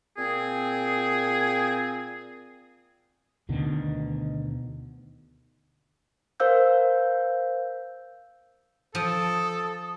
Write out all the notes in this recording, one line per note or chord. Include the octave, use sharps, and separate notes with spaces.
A#2 C4 G#4
D2 B2 D3 D#3
A#4 C5 F5 E6 G6
F3 A4 D#6